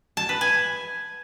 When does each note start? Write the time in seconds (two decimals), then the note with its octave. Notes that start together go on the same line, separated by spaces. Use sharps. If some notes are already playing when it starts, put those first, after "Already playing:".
0.17 A5
0.29 B4
0.41 G#5